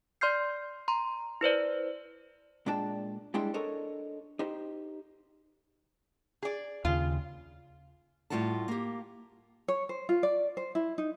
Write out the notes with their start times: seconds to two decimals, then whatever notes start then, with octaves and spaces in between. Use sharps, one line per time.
0.21 D5 C6 F6 G6 C7
0.88 A#5 C6
1.41 E4 B4 C5 D5
2.66 A#2 G#3 D4 D5 G5 A5
3.34 G3 G#3 D4 E4 G5 C6
3.54 D4 A4 A#4 C#5 D#5
4.39 D#4 G4 C5
6.43 G#4 D5
6.85 D#2 C#3 F4
8.30 A2 G3 C4 F4 F#4 A5
8.68 A#3 G4
9.68 C#5
9.89 C5
10.09 F4
10.23 D5
10.57 C5
10.75 E4
10.98 D#4